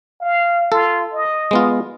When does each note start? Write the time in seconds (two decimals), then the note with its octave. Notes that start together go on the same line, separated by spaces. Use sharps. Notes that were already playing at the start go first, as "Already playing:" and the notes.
0.21 F5
0.72 F4 A4
1.13 D#5
1.51 G#3 B3 F4